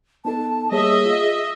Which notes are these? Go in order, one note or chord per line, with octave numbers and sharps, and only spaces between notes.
B3 D#4 A4 A5
G3 A#3 G#4 C#5 D#5 E5
F4